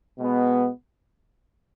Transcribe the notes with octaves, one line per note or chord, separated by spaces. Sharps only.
B2 G#3 B3